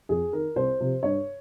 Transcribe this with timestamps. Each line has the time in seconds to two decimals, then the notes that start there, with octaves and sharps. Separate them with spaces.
0.09 F2 G#4
0.33 D#3 A#4
0.56 C2 C5
0.80 C3 F3
1.03 G2 C#5